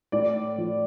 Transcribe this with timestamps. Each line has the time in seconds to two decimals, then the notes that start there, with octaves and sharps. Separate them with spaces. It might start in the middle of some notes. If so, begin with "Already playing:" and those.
0.12 A2 D5
0.58 F3